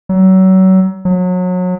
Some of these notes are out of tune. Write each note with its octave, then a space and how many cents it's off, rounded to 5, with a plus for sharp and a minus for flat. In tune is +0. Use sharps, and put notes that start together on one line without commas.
F#3 +30
F#3 -30